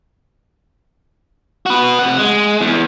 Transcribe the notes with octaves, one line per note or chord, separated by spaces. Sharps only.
F#4 B4
C3 F#5
G#3
E2